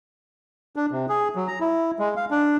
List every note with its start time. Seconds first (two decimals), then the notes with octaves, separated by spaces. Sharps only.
0.76 D4
0.92 C3
1.09 G#4
1.36 F#3
1.48 A#5
1.61 E4
1.99 G#3
2.16 F5
2.31 D4